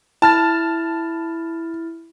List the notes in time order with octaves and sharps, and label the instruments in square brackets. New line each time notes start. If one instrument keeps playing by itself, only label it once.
[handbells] E4 F6 A6 [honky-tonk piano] A5